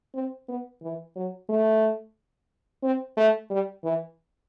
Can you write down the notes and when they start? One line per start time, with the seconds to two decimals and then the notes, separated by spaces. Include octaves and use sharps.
0.15 C4
0.49 B3
0.83 E3
1.16 F#3
1.49 A3
2.83 C4
3.17 A3
3.50 G3
3.84 E3